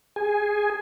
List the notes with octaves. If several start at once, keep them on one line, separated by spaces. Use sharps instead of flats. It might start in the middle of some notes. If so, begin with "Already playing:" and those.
G#4 G#5